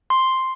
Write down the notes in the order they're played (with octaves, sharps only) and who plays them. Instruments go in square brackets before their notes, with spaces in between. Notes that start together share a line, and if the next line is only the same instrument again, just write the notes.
[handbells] C6